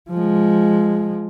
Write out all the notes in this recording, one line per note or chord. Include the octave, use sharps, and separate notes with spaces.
F3 G#3